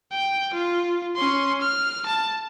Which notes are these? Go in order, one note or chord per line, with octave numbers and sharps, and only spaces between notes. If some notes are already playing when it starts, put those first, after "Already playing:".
G5
F4
C#4 C6
F6
A5